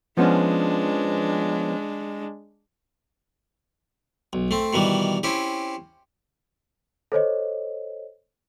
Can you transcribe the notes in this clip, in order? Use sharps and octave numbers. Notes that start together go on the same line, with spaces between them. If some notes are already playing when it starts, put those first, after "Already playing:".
F3 G#3 B3 C#4 D4
B1
A3 C4
B2 D#3 E3 G3
C4 C#4 E4 G4
A4 C5 C#5 D#5